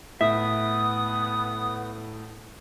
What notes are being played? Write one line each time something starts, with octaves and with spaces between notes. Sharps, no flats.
A2 B3 E5 D#6